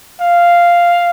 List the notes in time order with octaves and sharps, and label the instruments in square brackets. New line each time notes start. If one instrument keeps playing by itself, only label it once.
[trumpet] F5